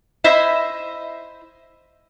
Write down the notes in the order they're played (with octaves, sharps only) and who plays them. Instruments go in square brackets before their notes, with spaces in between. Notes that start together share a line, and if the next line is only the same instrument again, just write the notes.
[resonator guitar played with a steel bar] E4 C5 D#5 E5